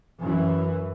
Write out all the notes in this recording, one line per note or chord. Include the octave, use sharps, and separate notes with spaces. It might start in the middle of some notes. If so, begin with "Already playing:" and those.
F#2 E3